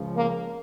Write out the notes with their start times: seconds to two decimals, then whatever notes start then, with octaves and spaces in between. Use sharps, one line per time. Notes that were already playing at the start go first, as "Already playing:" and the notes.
Already playing: C#2 C#3 F3
0.15 A#3